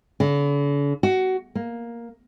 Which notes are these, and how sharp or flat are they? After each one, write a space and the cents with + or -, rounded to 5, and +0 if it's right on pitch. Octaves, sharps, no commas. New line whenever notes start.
D3 -45
F#4 +20
A#3 +5